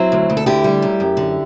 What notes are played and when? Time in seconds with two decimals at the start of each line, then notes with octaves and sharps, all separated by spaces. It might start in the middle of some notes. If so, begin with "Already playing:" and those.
Already playing: F#3 C4 E4
0.12 D2
0.30 D2
0.37 A4
0.46 D3 E4 G4
0.64 G3
0.82 F#2
1.00 F#2
1.17 D3